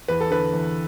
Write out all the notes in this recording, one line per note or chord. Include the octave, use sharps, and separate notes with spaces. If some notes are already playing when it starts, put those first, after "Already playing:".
E2 B4
A4
D3 B4
E2